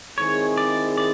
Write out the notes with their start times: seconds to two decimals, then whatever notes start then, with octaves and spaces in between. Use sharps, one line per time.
0.18 D#3 G#3 C4 E4 G#4 C#5
0.57 D5
0.98 D5